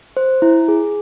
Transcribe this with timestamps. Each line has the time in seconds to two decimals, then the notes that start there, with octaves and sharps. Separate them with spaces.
0.17 C5
0.42 E4
0.68 G#4